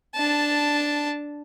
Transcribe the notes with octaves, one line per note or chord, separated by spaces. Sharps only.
D4 A5